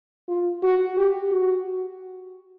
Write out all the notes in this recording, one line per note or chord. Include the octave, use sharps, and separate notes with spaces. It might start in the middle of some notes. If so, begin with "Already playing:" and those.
F4
F#4
G4
F#4